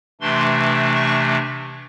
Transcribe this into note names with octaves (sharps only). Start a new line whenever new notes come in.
C3 E3 A3 D4 C6
C#6